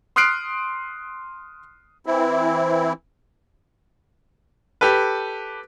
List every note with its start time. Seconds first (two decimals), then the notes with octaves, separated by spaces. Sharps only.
0.16 C6 D#6 F6 F#6 C7 D7
2.06 E3 C4 E4
4.81 G4 A4 B4